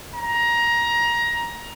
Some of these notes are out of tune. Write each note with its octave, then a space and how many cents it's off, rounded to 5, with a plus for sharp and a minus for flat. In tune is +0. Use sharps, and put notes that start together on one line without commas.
A#5 +20